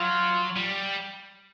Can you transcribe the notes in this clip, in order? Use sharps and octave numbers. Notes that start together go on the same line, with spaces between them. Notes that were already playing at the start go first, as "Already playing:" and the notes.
Already playing: F#3 F4
G3